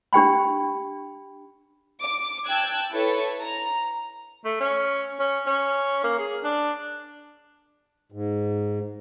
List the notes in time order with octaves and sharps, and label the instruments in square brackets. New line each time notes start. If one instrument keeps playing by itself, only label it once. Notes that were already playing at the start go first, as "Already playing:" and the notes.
[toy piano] D4 G4 G5 B5
[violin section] D6
G5 A5 E6 F#6 G#6
E4 A4 B4 C#5
A#5
[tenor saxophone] A3
C#4
C#4
C#4
A#3
G#4
D4
[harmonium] G#2